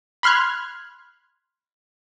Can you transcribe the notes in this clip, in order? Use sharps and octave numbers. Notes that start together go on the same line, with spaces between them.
B5 C6 F6 F#6 G#6